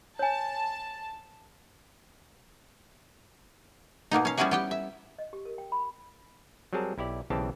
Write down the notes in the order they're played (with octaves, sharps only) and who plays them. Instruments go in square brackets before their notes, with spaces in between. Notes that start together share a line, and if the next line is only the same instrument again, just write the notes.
[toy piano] C#5 G#5 [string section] A5
[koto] B2 A#3 B3 D#4
C#4 F5
G3 B3 C#4 E4 F#4 G#4
B3 G4 G5
E5
[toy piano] D#5
G4
A#4
G5
B5
[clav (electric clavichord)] F#3 G3 C4 G#4 A#4 A5
B1 E4 G4 D5
B1 C#3 E3 C4 G4 A5